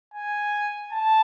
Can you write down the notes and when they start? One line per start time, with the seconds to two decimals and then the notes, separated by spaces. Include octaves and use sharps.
0.14 G#5
0.92 A5